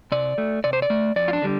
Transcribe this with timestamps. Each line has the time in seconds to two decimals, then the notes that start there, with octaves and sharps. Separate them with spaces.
0.12 C3 D5
0.38 A3
0.64 C3 D5
0.73 C5
0.82 D5
0.90 A3
1.16 F2 D5
1.28 F4
1.33 D4
1.42 D3 G3